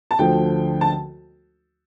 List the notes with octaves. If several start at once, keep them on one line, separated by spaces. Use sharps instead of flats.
A5
D2 D3 F3 G5
A5